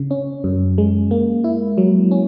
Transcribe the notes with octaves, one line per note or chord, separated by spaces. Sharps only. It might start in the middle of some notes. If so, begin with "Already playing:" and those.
Already playing: C#3
C#4
F#2
G#3
A#3
E4
F#3
C#4